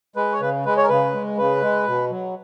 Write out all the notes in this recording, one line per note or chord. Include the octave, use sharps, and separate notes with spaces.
G#3 B4
C#5
C#3 B4
G#3 B4
C#5
A#4
C#3 B4
G#3
C#3 B4
G#3
B2
F#3